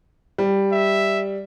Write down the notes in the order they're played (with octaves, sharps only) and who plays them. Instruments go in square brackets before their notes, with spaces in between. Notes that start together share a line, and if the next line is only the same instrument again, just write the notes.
[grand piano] G3
[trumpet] E5